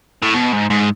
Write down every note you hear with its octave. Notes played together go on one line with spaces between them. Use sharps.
A2
B2
G#2
G#2